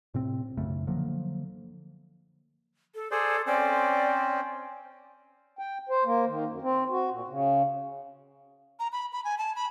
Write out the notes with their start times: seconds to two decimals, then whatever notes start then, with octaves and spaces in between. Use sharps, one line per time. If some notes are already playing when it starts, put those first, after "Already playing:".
0.14 A2 C3 C4
0.57 B1 F#2 C#3 A3
0.87 D3 F3 F#3 A#3
2.95 A4
3.11 G#4 A4 C5 D5
3.47 C4 C#4 C5 D5
5.59 G5
5.89 C5
6.04 A#3
6.26 D#3
6.47 F#2
6.62 C4
6.90 F#4
7.10 A#2
7.28 C#3
8.79 A#5
8.92 B5
9.12 B5
9.25 G#5
9.38 A5
9.56 B5